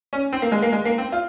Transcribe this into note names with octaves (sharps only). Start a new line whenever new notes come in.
C#4
C4
A#3
G#3
A#3
G#3
A#3
C4
F4